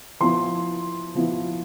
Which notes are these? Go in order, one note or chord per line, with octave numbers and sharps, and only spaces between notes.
F3 B3 E4 C6
F3 B3 E4